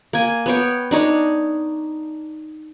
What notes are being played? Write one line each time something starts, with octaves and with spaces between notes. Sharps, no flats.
A#3 G#5
B3 C#5 G5
D4 D#4 C#5